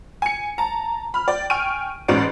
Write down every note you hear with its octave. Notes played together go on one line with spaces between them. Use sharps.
G#5 C#7
A5 A#5
B5 F6
D5 G5
G5 G#5 C#6 F6 D7 D#7
A1 G#2 C#4 F#4 D5 D7